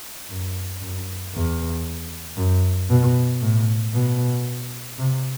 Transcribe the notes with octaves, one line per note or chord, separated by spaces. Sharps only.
F#2
F#2
E2
F#2
B2
A2
B2
C3